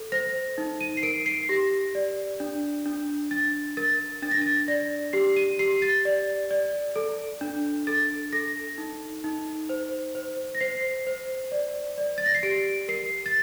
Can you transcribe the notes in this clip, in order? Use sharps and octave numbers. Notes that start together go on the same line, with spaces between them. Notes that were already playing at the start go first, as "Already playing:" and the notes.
Already playing: A4
C5 A#6
D#4
D#7
C7
A#4 D7
C7
G4 A#6
D5
D4
D4
D4 A6
A#4 A6
D4 A6
A#6
A6
D5 A#6
G4 C7
D#7
G4 C7
A6
D5
D5
A4
D4
A4 A6
A4 A#6
D#4
D#4
C5
C5
A#6
C5 C7
C5
D5
D5
A6
A#6
C7
G4 D7
A#4 C7
A6